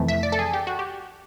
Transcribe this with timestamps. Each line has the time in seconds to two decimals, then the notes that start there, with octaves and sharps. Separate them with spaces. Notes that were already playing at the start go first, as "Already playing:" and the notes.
Already playing: F2 C3 E3 A3
0.08 E5
0.23 D5
0.32 A4
0.39 G#4
0.53 G4
0.67 F#4
0.79 G4